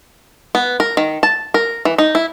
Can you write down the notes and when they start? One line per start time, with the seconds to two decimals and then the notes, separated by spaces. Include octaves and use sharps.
0.55 B3
0.80 A#4
0.97 D#3
1.23 A5
1.54 A#4
1.85 E3
1.98 D#4
2.15 E4